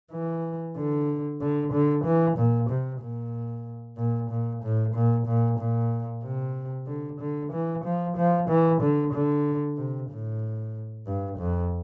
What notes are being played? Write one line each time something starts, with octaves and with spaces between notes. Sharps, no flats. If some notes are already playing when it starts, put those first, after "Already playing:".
E3
D3
D3
D3
E3
A#2
C3
A#2
A#2
A#2
A2
A#2
A#2
A#2
C3
D3
D3
E3
F3
F3
E3
D3
D3
C3
A2
G2
F2